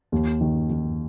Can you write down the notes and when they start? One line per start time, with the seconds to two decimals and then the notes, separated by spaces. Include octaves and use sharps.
0.12 D#2
0.41 D#3
0.70 D#3